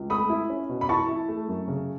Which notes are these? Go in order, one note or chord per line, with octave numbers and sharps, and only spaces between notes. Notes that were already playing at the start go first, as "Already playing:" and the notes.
Already playing: C#2
A3 B5 D#6
E4
C#4
B2
B5
E3 A5 C#6
E4
A3
F#2
C#3